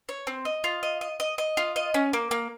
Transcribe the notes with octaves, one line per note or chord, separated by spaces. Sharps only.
C#5
C4
D#5
F4
D#5
D#5
D#5
D#5
F4
D#5
C#4
A#3
A#3